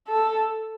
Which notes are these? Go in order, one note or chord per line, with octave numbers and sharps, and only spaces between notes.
A4